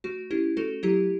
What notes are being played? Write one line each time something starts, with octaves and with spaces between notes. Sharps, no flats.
A3 F#4
C#4 E4 G4
A3 F#4 A4
F#3 E4 G4